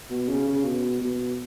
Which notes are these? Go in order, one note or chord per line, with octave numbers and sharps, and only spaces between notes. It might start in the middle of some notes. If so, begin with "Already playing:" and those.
B2
C#3
C#3
B2
B2